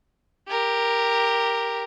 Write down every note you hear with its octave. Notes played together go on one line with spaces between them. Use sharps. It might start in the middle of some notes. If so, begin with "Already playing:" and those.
G4 A#4